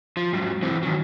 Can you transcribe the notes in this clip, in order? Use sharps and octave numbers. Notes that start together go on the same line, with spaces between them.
F3
G#2 F#3
E3 C4
D#3 F#3